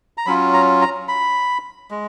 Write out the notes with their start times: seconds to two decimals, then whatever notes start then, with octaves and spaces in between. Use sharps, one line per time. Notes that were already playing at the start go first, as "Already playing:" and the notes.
0.18 A#5
0.26 F#3 C#4 F4 B5
0.54 A#5
0.81 A#5
1.08 B5
1.91 G#3